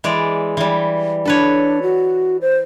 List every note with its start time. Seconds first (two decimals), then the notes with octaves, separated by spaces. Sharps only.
0.04 E3 G#3 D5
0.57 E3 G3
1.25 D4 A4 B4 C#5
1.82 F#4
2.41 C5